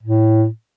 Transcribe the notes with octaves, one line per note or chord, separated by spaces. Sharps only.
A2